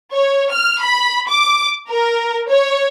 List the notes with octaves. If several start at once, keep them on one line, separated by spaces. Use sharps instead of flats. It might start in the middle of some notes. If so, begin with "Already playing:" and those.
C#5
F6
B5
D6
A#4
C#5